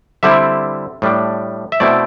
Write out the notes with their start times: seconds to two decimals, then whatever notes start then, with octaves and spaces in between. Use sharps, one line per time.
0.23 D3 G3 C4 E4 E5
1.02 A2 G3 D4
1.72 E5
1.80 B2 A3 C4 E4 D5